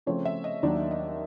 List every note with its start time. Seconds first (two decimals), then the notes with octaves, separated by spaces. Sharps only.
0.06 C#3 F3 A3 C4 C#5
0.25 E5
0.44 D#5
0.63 D#2 D#3 F#3 A#3 D4 D5
0.91 D#5